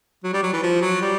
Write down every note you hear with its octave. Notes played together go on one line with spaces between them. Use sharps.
F#3
G3
F#3
E3
F3
F#3
G3